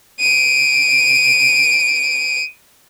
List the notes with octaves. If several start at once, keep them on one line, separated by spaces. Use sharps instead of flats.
D7 D#7